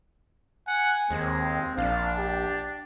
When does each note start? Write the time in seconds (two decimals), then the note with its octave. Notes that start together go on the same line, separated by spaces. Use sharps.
0.67 F#5 G#5
1.11 D#2 G#3 C4
1.78 A#1 D4 F5
2.18 G4